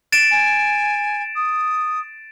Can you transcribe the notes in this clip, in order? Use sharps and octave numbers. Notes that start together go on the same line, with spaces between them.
A6 D7 E7
G#5
D#6